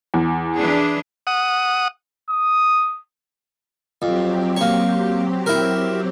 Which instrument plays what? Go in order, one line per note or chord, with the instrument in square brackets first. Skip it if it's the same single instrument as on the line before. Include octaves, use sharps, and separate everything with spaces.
[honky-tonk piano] E2
[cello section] E3 D4 G#4
[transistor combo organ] F#5 D#6
[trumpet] D#6
[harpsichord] F2 [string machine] F#3 C4 G4
[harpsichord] A#3 C#5
E4 A#4